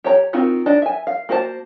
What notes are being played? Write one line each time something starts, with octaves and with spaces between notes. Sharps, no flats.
G4 C#5 A#5
C4 D#4 F4 F#4 A#4
D4 D#4 D#5
E5 G#5
F5
A#3 F#4 C5 D5 A5